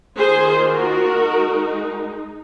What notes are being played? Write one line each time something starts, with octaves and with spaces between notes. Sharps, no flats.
D#3 A#3 F4 G#4 C5
F#4 A#4
G#3 D#4